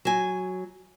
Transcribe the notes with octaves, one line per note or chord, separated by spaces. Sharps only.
F#3 G#5